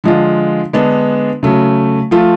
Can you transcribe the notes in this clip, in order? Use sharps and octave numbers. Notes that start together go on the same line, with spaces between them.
D3 F3 G#3 D4 F4
D3 G#3 B3 D4
C#3 F#3 A3
F3 A3 F4